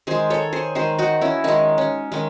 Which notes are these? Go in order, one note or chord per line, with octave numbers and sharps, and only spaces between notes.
D#3 G#3 G#4 C5
A4 C#5
G#4 C5
D#3 G#3 G#4 C5
D#4 F#4
C#4 E4
D#3 G#3 D#4
C#4
D#3 G#3